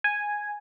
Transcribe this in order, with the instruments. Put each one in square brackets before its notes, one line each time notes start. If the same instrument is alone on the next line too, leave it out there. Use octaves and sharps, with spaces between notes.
[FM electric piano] G#5